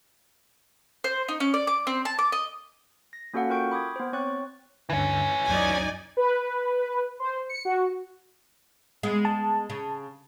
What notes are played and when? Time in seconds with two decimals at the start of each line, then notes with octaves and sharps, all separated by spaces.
1.04 C5
1.28 D#4
1.40 C#4
1.54 D5
1.67 D6
1.87 C4
2.05 A5
2.19 D6
2.32 D#5
3.13 A#6
3.33 A#3 C#4 F#4 A4 F5 F#5
3.50 F4 A#4 G5 C#6 G6 D7
3.71 B5 D6 D#6 G#6
3.96 B3 C5
4.13 C4 C#5 C#6 D6 F#6 A6
4.90 D2 G2 D3 E3 C#4
5.48 C#2 F#2 F#3 D#4 D5 G#5
6.17 B4
7.20 C5
7.49 C#7
7.65 F#4
9.03 G#3 B3
9.25 A5
9.70 C#3